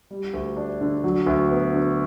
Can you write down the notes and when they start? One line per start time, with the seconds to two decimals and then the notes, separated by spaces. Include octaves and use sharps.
0.11 G3
0.34 D2
0.57 D4
0.81 D3
1.04 F#3
1.26 D2
1.51 B3
1.74 D3